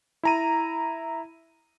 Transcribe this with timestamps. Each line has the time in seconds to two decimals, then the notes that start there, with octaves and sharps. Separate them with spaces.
0.23 E4 A#5 D#7